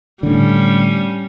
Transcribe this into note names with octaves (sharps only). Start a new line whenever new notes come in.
A2 D3 G3 C#4